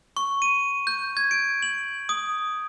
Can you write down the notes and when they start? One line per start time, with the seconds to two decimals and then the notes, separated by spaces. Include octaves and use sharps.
0.17 C#6
0.42 D#7
0.87 G6
1.17 G#6
1.31 D7
1.63 F#7
2.09 D#6